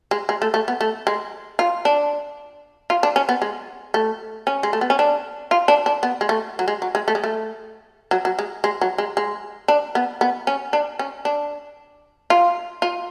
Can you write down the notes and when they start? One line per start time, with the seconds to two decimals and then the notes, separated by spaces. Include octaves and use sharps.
0.11 G#3
0.29 G#3
0.42 A3
0.54 A3
0.68 B3
0.81 A3
1.07 G#3
1.59 F4
1.85 D4
2.90 F4
3.03 D4
3.16 C#4
3.29 B3
3.42 G#3
3.94 A3
4.47 C#4
4.63 G#3
4.73 A3
4.81 B3
4.90 C#4
4.99 D4
5.51 F4
5.68 D4
5.86 D4
6.03 B3
6.21 G#3
6.29 A3
6.59 F#3
6.68 G#3
6.82 F#3
6.95 G#3
7.08 A3
7.15 G#3
7.24 A3
8.11 F#3
8.25 F#3
8.39 G#3
8.64 G#3
8.81 F#3
8.98 G#3
9.17 G#3
9.68 D4
9.95 B3
10.21 B3
10.47 C#4
10.73 D4
10.99 C#4
11.25 D4
12.30 F4
12.82 F4